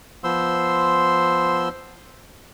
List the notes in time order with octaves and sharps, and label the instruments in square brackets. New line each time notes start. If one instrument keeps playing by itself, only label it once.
[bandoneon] F3 B3 C5 C6 E6